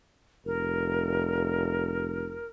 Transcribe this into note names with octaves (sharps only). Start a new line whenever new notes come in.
F1 A#4